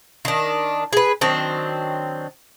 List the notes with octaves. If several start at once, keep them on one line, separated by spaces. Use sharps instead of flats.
D#3 D4
G#4 B4
D#3 F#3 C4 D4